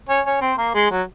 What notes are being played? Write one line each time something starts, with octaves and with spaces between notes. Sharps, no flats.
C#4 C#5
C#4 C#5
C4 C5
A#3 A#4
G#3 G#4
F#3 F#4